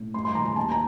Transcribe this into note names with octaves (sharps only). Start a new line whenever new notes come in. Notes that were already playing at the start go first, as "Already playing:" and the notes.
Already playing: A2
G2 C6
C6
D#3 A#5
A#5
D#2 A5
A#5